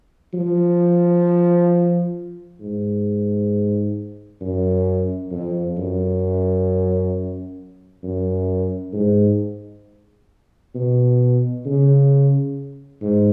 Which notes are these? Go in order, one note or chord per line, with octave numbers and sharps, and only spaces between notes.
F3
G#2
F#2
F2
F#2
F#2
G#2
B2
C#3
G#2